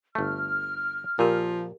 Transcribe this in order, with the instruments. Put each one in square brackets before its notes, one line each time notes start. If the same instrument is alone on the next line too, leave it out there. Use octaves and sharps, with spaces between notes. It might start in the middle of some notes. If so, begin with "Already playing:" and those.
[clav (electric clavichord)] G1 A3 [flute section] F6
[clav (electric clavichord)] A#2 [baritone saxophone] F3 [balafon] G4 A#4